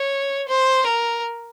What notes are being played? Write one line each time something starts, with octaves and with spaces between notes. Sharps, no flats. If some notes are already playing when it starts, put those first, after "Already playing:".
Already playing: C#5
C5
A#4